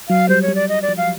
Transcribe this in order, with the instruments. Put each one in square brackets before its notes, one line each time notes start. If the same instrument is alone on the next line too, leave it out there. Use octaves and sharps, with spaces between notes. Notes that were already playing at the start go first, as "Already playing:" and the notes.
[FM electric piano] F#3 [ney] F5
[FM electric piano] G3 [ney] C5
[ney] C#5
[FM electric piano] G3
[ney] D5
D#5
D5
[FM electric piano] F3
[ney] F5